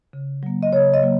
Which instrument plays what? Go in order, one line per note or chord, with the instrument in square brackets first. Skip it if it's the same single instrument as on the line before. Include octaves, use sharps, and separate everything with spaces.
[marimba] C#3
F#3 A#3
D#5
C#3 C#5
D#5
F#3 A#3